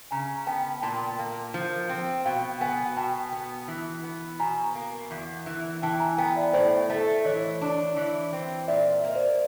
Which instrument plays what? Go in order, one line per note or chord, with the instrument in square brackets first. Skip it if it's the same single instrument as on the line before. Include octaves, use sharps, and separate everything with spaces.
[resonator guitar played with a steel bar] C#3 [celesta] G#5 A#5
[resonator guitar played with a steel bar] B3 [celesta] G5 A5
[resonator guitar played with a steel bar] A#2 [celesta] G5 A5
[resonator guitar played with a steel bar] A#3
F3
C4
[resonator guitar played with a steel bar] B2 [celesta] F5 G5
[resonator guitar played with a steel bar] B3 [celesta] F#5 G#5
[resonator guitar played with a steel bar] B2 [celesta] G5 A5
[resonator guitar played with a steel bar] B3
E3
B3
[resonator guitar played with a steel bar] B2 [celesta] G#5 A#5
[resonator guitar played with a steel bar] A#3
E2
E3
[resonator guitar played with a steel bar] E3 [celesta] G5 A5
[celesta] G#5 A#5
[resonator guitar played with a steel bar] B3 [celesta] G5 A5
[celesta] D5 E5
[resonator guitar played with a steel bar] A2 [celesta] C5 D5
[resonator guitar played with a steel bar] A3
[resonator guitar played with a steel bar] E3 [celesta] C#5 D#5
[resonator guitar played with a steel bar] D4
E3
C4
[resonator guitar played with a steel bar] A#2 [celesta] D5 E5
[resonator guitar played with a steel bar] A#3 [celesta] D#5
[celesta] C5 D5